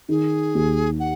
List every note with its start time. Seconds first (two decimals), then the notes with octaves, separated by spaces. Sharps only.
0.09 D#3 G#4
0.55 D#2
1.00 F#5